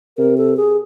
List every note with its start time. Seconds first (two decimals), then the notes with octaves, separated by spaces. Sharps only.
0.18 C3 A#4
0.38 A4
0.57 G#4